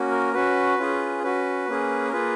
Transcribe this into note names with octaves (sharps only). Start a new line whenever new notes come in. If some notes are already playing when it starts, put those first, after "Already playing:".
Already playing: A#3 C#4 F#4
A#4
C#4 F#4 B4
C#4 F4 G#4
C#4 F#4 B4
A#3 C#4 G#4
A#4
A#3 F4 G#4 B4